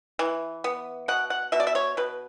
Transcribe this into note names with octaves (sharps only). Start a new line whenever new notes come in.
E3
B3
B2 F#5
F#5
B2 E5
D5
E5
C#5
B2 B4